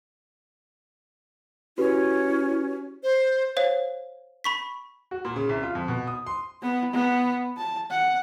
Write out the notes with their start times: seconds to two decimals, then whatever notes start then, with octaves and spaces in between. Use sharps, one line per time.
1.78 C#4 E4 F#4 G4 B4
3.03 C5
3.57 C5 C#5 F5
4.44 B5 C#6 B6
5.11 F#4
5.25 A#2
5.36 C#3
5.49 C2
5.63 F4
5.75 F2
5.88 B2
6.07 D#6
6.26 C6
6.62 B3
6.93 B3
7.58 A5
7.91 F#5